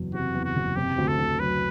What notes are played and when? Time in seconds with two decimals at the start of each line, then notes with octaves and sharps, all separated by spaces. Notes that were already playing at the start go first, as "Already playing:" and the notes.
Already playing: F#1 E2 F#3
0.14 C3 F#4
0.35 E2
0.44 F#4
0.56 F#1
0.76 C3 G4
0.98 D2
1.08 A4
1.19 D2
1.39 F#3 B4